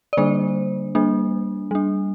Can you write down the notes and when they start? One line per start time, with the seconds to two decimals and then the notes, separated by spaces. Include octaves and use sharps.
0.13 D5
0.17 D3 G3 A#3 D4 C5
0.95 G3 A#3 D4
1.71 G3 D4